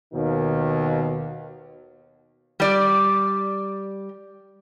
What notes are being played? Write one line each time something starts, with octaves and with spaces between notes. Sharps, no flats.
D#2 B2 D#3
G3 D5